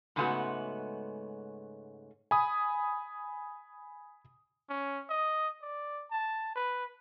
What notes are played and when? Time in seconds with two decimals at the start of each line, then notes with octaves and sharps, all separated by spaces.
0.16 G#2 C#3 G#3 A3 B3 F#4
2.31 G#5 B5 D#6
4.69 C#4
5.10 D#5
5.62 D5
6.11 A5
6.56 B4